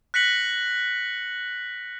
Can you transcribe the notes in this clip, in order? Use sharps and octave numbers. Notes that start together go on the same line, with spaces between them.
F#6 A#6 B6 C#7 F#7